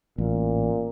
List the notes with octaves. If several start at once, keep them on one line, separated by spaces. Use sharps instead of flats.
A1 A#2